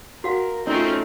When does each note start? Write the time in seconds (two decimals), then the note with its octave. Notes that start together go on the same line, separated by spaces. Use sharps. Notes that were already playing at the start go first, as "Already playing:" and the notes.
0.24 F#4 A#4 F5 F#5
0.67 A3 C4 C#4 D#4 F4